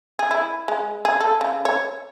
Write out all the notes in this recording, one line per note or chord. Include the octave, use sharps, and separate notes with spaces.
G#4
E4
G#3
G#4
A4
C#3
C#5